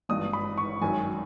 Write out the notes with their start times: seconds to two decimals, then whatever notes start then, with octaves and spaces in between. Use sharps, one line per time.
0.09 G#1 G2 E3 D#6
0.33 B5
0.58 C#6
0.81 G#1 F#2 D#3 F#3 G#5